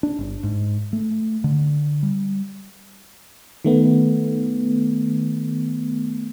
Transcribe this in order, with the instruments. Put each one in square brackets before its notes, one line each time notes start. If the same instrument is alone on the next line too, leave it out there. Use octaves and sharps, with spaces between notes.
[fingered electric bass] D4
G1
G#2
A3
D3
G3
[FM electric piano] D#3 A3 B3